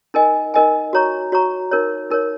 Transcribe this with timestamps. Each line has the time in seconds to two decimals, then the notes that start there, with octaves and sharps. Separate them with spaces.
0.14 D#4 A#4 D#5 G#5
0.54 D#4 A#4 D#5 G#5
0.93 F#4 C#5 A#5 C#6
1.32 F#4 C#5 A#5 C#6
1.72 D#4 A#4 C#5
2.11 D#4 A#4 C#5